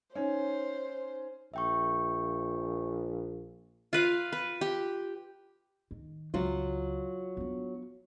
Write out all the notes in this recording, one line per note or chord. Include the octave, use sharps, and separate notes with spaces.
C#4 D#4 C5
A#1 E5 G5 C#6
F4 B4 F5
B4
G4
D#3
C#2 F#3 F4
B3 D4